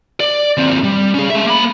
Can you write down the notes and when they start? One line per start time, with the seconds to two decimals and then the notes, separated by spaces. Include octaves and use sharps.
0.20 D5
0.57 D#2 C4
0.84 G3
1.14 C#4 G#4
1.30 G#3 E5
1.46 A#3 B5